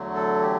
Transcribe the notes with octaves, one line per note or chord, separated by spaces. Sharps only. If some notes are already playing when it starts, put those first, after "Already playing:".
Already playing: E2 D3 F#3 A3
A4
G4